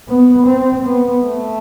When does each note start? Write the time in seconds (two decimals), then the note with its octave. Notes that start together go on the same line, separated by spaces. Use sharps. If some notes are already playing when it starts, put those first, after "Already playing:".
0.09 B3
0.46 C4
0.84 B3
1.23 A3